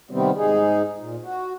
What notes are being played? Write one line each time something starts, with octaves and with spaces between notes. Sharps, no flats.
C3 D#3 G3 B3 C4
G#2 D#4 G#4
A#2
F#4